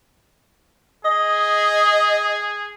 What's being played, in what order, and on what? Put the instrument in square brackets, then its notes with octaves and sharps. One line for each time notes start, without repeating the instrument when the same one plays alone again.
[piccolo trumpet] G#4 [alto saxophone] D#5